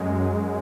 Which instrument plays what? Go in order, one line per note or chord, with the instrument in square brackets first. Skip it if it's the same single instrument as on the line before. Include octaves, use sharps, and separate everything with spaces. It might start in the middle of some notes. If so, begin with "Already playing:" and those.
Already playing: [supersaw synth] F#2 G#3